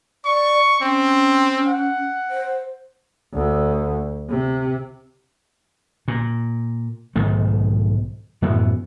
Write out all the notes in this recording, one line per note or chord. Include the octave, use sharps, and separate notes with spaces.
D5 C#6
C4 C#4
F#5
C5
D2
C3
A#2
B1 G#2 D#3 A3
F#2 A2 E3 B3